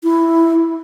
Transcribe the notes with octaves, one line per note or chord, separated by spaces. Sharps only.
E4